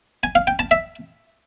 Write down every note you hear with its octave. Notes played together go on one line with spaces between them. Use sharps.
G#5
F5
G5
A5
E5